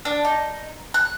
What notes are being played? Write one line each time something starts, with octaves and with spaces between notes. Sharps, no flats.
D4
D#4
F#6